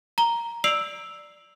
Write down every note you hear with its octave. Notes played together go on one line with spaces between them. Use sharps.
A#5 G7
D5 E6 C7 D7 F7 F#7